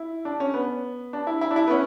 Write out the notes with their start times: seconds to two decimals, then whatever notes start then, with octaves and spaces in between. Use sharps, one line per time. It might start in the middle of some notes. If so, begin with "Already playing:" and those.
Already playing: E4
0.25 D4
0.40 C#4
0.54 B3
1.13 D4
1.27 E4
1.41 E4
1.51 D4
1.56 E4
1.68 B3
1.71 C#4